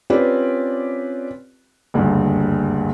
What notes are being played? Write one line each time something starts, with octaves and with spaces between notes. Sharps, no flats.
C4 C#4 F4 G4 B4 D5
F#1 D2 G2